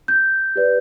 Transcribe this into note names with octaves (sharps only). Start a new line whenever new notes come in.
G6
G4 B4 D5